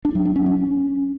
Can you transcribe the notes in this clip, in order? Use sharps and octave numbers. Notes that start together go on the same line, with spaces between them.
D4
F#3
D4
C#4
C#4